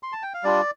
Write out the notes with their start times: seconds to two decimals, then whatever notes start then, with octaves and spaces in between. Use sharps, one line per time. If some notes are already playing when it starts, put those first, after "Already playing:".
0.03 C6
0.13 A5
0.23 G5
0.34 F5
0.43 G3 D4 F4 D5